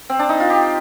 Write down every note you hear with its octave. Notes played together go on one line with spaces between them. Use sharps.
C4
D4
D#4
F4
G4